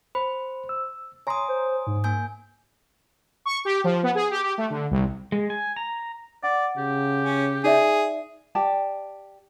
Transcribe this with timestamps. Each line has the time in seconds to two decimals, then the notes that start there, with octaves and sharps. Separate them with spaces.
0.15 C5 B5
0.69 E6
1.27 C#5 G#5 A#5 C6 D#6
1.48 C5
1.87 G#2
2.04 A#3 G#5 G6
3.45 C#6
3.65 G4
3.84 F3
4.03 B3
4.15 G#4
4.31 G4
4.43 G4
4.58 A3
4.70 D3
4.91 C2
5.32 G#3
5.50 G#5
5.76 A#5
6.43 D5 F#5
6.78 C#3 G4
7.22 C#4
7.64 D#4 G#4 D5 E5
8.55 G4 D5 A5